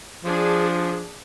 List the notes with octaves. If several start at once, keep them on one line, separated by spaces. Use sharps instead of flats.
F3 D4 G#4